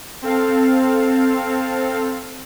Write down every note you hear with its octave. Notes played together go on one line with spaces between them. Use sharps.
C4 A4 F5